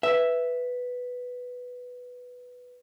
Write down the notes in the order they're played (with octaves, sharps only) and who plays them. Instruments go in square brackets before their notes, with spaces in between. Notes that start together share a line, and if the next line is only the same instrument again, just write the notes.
[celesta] B4 B6 [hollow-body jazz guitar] E5